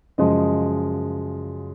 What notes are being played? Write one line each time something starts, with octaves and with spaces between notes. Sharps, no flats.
F#2 C#3 F3 G#3 D#5